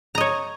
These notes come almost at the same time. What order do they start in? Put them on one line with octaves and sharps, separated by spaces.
A#5 D#5 C#5